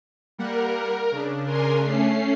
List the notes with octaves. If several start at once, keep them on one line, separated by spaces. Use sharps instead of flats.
G3 A#3 A#4 F#5
C#3 D4
A#4 G#5 C6
A3 C#4 C7